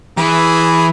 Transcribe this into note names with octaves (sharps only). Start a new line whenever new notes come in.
E3 G#4 B5